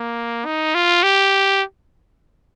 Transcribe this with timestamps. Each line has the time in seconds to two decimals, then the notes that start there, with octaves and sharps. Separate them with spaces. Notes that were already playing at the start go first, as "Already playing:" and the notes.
Already playing: A#3
0.46 D#4
0.75 F4
1.03 G4